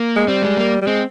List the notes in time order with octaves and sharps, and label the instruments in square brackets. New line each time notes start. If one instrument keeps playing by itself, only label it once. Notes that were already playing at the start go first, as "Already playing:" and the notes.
Already playing: [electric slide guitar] A#3
[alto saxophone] G#3
[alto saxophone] G3 [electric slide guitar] C4
[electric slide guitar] G#3
A#3
[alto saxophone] G3
[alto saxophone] G#3 [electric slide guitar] C4